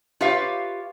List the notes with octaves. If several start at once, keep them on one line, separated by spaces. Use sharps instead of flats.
F4 G4 B4 C#5 E5 F5